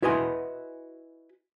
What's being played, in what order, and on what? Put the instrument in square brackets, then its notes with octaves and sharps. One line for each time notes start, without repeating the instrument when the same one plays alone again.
[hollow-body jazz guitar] E4 F#4 B4 D#5 G#5 C6